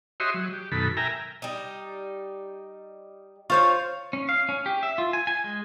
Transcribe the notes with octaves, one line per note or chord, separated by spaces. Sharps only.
F#4 G4 C#5 D#5 E5 C6
F#3
G4
F#2 B2 D#3 A4 B5
A#4 E5 G5 G#5 A#5
G3 D#4
F4 C5 C#5 F5 C#6 G6
C#4
F5
C#4
G4
E5
F4
G#5
G#5
G#3